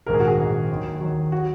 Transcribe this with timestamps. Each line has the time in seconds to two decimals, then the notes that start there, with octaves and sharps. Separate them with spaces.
0.06 A#1 G#2 D#3 A#4
0.14 G#4
0.20 F#4
0.28 G#4
0.38 A#1 G#2 D#3
0.70 D#2 D#3 F#3
1.00 D#2 D#3 F#3
1.32 F#3 F#4